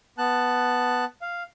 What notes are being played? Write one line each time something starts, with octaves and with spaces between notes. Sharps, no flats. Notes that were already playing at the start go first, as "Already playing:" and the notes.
B3 A5 F#6
F5